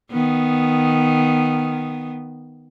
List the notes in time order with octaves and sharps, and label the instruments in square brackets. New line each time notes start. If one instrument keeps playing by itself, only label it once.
[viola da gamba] D#3 B3